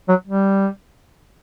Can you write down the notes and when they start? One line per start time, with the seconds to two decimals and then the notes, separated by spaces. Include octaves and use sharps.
0.09 F#3
0.28 G3